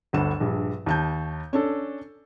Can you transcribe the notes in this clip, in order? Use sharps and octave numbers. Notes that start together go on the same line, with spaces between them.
G1 D2 A4 E7
A#1 G2
D#2 A5 G6
C#4 D4 A4